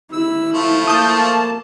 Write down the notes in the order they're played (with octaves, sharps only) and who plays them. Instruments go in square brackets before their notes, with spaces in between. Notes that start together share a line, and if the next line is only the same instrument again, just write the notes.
[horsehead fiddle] E4 [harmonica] E6
[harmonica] F3 A3
[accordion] A#3 A5 [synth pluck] D#6 G6